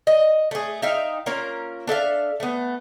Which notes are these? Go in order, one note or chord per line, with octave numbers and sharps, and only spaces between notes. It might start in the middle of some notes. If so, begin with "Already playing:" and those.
D#5
A3 G#4
D#4 E5 F5 G5
A#3 C#4 F4 A#4
D4 A4 E5 F5
A3 B3